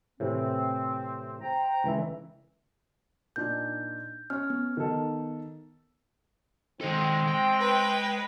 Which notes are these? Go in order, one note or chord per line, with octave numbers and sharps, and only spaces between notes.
A2 C3 E3 C4
C5 G5 A#5
C#2 E3 E5
A#2 D4 D#4 G6
C#4 F6
B3
D#3 A4
D#3 G#3 C4 A4
G5
B4